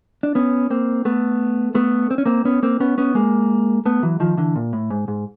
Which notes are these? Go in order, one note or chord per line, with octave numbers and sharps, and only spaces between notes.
D4
B3 C#4
A#3 C4
A3 B3
A3 B3
C4
C#4
A#3 C4
B3 C#4
A#3 C4
B3 C#4
B3 C#4
G#3 A#3
A3 B3
E3 F#3
D#3 F3
D3 E3
A#2
A2
G#2
G#2